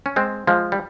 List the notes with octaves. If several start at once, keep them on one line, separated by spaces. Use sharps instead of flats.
C#4
G#3 C4
F3 G#3
G3